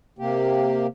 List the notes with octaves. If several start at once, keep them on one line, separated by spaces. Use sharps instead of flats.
C3 A#3 G4